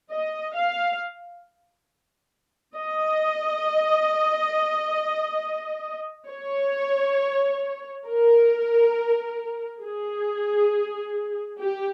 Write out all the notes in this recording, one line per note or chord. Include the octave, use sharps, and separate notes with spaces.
D#5
F5
D#5
C#5
A#4
G#4
G4